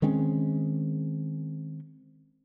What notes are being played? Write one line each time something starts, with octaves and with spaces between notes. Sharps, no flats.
D#3 G#3 C4 C#4